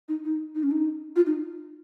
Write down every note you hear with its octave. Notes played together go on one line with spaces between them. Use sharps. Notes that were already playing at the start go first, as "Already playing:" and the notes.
D#4
D#4
D#4
C#4
D#4
F4
D#4